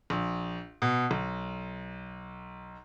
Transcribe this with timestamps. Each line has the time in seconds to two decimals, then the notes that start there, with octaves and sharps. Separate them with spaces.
0.10 A#1
0.82 B2
1.11 B1